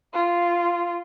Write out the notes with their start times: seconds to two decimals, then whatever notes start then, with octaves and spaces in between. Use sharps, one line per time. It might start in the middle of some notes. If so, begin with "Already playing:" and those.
0.14 F4